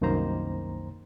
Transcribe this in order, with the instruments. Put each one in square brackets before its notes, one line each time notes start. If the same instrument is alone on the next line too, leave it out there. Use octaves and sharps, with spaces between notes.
[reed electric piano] C2 F#2 D#3 A#3 C5 A#5